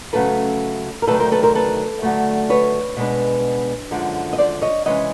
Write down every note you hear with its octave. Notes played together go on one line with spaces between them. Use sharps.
C#3 F#3 A3 C#4 A4 B4
A#4
D2 C3 D#3 F#3 A3 A4 B4
A#4 C5
A4 B4
A#4 C5
A4 B4
D3 F#3 A3
B4 C#5
B2 G#3 B3 D4
F#2 D3 F3 G#3
D#5
C5 D5
C#5 D#5
C3 E3 G#3 C#4 C#5 D#5